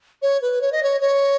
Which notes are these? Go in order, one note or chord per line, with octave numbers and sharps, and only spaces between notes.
C#5
B4
C#5
D#5
C#5
C#5